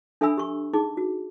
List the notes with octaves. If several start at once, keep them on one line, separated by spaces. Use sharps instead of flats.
D4 A4 E5 G#5 B5 E6
G4 C#6
D#4 G#4 D6
F#4